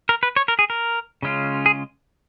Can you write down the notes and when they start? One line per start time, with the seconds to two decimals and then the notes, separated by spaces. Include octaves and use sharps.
0.09 A#4
0.23 B4
0.36 C#5
0.48 A#4
0.59 G#4
0.70 A#4
1.23 C#3 G#3 C#4 F4
1.66 G#4